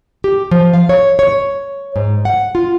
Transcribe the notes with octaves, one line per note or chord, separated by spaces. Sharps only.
G4
F3
F5
C#5
C#5
G#2
F#5
F4